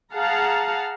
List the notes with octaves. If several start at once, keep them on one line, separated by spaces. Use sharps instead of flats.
G#4 F5 F#5 A5 A#5